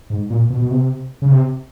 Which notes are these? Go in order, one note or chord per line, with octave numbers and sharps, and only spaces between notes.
G#2
A#2
B2
B2
C3
C#3
C3